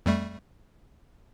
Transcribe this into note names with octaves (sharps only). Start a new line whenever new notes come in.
F2 G3 A3